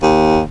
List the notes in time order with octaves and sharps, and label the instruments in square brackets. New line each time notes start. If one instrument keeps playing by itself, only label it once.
[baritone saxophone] D#2